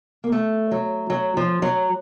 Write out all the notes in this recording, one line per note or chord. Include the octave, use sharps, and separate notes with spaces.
A#3
A3
F#3
F#3
F3
F#3